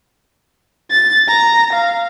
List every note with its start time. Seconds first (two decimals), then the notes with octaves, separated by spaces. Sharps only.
0.91 A6
1.29 A#5
1.73 F5